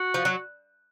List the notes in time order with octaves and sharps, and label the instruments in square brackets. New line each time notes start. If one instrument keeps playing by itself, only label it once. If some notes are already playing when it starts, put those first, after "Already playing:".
Already playing: [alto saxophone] F#4
[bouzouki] F3
F#3